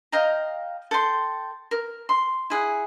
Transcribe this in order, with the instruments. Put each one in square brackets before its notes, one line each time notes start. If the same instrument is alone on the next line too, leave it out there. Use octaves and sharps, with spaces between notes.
[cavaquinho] D#5 F5 G5 A#5
A4 G5 C6
A#4
C6
E4 G#4 F#5